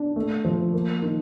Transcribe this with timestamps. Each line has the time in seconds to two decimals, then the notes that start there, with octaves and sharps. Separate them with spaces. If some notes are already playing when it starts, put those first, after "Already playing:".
Already playing: D4
0.16 A3
0.45 F3
0.73 A#3
1.02 D#3